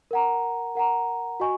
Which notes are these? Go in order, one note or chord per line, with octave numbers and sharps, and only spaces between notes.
A#4 F#5 A#5
A#4 F#5 A#5
F#4 D#5 G#5 C#6